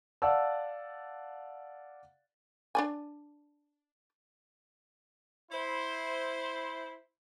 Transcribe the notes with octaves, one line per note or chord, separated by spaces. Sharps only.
D5 F5 F#5 A5 E6
D4 D5 G#5
E4 C5